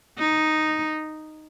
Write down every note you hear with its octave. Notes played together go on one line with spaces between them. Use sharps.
D#4